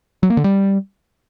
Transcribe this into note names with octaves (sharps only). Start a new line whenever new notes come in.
F#3
A#3
D3
G3